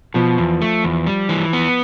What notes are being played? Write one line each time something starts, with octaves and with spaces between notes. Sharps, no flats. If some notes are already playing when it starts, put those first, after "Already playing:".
B2 F3
E2
A3
E2
G3
E3
B3